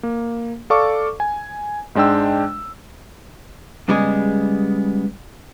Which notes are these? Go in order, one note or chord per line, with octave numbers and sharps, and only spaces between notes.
A#3
A4 D5 F5 A5 C#6 D6
G#5
G#2 G#3 D4 G5 E6
C#3 G3 G#3 B3 G#4